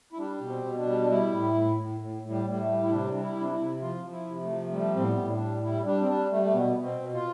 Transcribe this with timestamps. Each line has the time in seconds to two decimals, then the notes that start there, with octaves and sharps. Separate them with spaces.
0.13 E4
0.18 G3 D4
0.41 B2
0.48 C4
0.64 B2
0.78 D4
0.86 G3
1.02 D4
1.09 G3 E4
1.32 A2
1.55 A2
1.77 A2
2.00 A2
2.23 A2
2.30 G3
2.45 A2 G3
2.60 A3
2.68 G3
2.83 E4
2.91 C3 D4
3.12 G3 D4
3.21 E4
3.36 C3 D4
3.51 E4
3.59 C3
3.81 F3 F4
4.04 F3
4.12 E4
4.27 C3
4.42 A3
4.49 F3
4.72 G3 A3
4.95 A2 C4
5.03 B3
5.17 A2
5.33 D4
5.40 G3
5.63 G3 E4
5.86 G3 D4
6.02 C4
6.08 G3 D4
6.31 G3 A3
6.43 A3
6.54 B2 B3
6.76 B2
6.84 C4
7.00 B2
7.14 F4